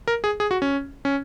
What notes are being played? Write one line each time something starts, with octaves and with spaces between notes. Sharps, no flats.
A#4
G#4
G#4
F#4
C#4
C#4